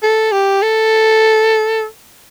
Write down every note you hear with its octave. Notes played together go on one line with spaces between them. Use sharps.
A4
G4
A4